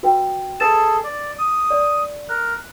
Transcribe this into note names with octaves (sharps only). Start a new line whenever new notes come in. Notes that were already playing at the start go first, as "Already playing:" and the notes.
F#4 B4 G5
G#4 A4 B4 A6 E7
D5
D#6
D5
A#4 F#6